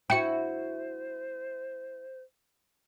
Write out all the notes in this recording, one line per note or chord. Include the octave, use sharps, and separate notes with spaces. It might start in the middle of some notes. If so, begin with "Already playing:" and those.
E4 F#4 C5 G5 C#7